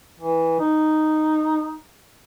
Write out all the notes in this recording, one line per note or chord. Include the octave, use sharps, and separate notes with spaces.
E3
D#4